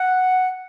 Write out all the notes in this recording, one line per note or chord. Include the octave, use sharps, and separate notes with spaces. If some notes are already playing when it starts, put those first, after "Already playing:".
Already playing: F#5